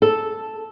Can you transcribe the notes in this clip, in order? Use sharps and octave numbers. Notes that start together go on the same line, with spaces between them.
A4